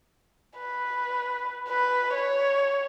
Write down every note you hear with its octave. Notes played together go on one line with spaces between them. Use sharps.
B4
B4
C#5